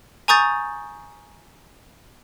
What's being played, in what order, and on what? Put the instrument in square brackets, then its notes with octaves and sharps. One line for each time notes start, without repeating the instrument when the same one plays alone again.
[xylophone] G#5 A#5 C#6 D#6 G6 A6